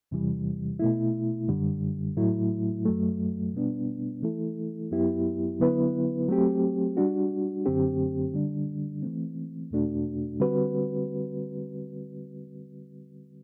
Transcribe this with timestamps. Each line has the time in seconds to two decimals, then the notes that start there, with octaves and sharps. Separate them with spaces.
0.11 E2 C3 E3 G3
0.79 B2 A3 E4
1.48 F#2 D3 G3
2.17 A2 F#3 A3 E4
2.85 F#2 F#3 A3
3.54 B2 G3 B3 D4
4.23 E3 A3 E4 A4
4.91 F#2 F#3 B3 E4 G4
5.60 D3 F#3 B3 E4 B4
6.28 F#3 A3 C4 G4
6.97 G3 D4 F#4
7.66 F#2 D3 F#3 C4 G4
8.34 D3 G3 D4
9.02 E3 A3 C4
9.71 E2 B2 A3 D4 F#4
10.40 D3 G3 C4 F#4 B4